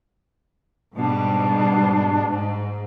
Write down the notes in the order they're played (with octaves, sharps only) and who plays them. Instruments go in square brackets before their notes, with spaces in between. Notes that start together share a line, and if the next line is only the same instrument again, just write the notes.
[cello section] G#2 B2 G3 [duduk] D4
[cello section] G#2